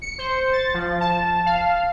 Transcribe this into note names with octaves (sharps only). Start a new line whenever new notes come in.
C#7
C5
A6
F3
A5
F5